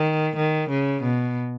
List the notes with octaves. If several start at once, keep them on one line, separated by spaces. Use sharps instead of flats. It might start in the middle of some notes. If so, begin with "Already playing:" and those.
Already playing: D#3
D#3
C#3
B2